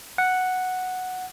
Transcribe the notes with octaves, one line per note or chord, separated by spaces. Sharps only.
F#5